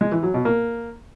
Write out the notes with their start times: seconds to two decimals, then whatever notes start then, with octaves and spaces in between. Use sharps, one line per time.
0.01 G#3
0.12 E3
0.23 F#3
0.34 B2
0.45 A#3